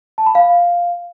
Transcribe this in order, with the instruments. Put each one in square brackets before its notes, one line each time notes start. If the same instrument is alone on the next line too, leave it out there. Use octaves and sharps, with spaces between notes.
[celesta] A5
B5
F5